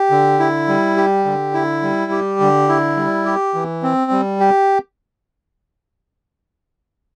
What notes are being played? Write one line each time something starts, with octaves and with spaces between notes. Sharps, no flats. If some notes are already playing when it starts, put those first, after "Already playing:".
Already playing: G4
D3
E4
G3
G4
D3
E4
G3
G4
D3
E4
G3
G4
E3
C4
G3
G4